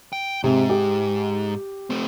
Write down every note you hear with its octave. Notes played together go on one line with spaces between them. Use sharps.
G5
G#2 C3
G4
A3 C4